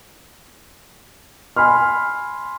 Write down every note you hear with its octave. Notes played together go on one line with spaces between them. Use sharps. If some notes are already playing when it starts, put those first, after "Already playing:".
G#5 B5 C6 F6